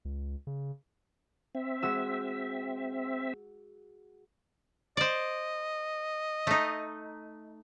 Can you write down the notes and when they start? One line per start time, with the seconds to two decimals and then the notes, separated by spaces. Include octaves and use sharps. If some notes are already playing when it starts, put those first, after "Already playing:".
0.05 C#2
0.47 C#3
1.55 C4 E5
1.82 G#3 F#4 E6
4.97 C5 D5 D#5
6.47 A3 D#4